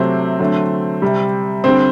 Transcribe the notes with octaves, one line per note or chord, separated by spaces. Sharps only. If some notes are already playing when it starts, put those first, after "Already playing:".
Already playing: C3 F#3 A3 C4
D3 F#3 A3
C3 G3
D3 G3 C4